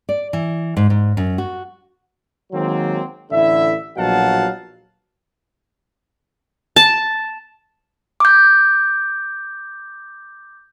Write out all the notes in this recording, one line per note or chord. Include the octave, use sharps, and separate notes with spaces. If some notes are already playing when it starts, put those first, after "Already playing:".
D5
E3
G#2
G#2
F#2
F#4
D#3 F#3 G#3 A#3 C4
A1 D3 E4 E5
A#1 B2 F#3 F5 F#5 A5
A5
D6 G6